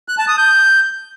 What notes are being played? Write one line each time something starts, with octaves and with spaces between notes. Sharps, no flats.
F#6
A5
D#6
G6